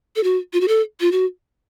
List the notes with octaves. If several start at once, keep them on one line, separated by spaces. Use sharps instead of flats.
A4
F#4
F4
F#4
A4
F4
F#4